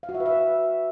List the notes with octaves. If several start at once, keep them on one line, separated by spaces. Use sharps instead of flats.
F5
F#4
E5
B4
E5